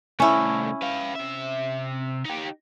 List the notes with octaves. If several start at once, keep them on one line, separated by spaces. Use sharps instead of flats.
C2 A3 C#4 E4
B4 F5
C3 E5
D#4 G4